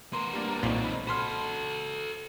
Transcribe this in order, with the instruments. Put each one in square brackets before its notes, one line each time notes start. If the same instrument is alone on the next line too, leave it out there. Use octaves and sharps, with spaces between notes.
[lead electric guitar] B3 A#4 [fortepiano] C6
[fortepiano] G3 A#3 D4
[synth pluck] B1 A#2 [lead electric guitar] C4 D#4
[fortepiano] B5
[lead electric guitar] F#4 A4 [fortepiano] B5 C6 F6